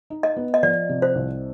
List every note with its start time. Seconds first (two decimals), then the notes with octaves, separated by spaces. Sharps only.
0.10 D#4
0.23 D#5
0.36 B3
0.54 D#5
0.63 F3 D5
0.89 C3
1.02 C5
1.15 C2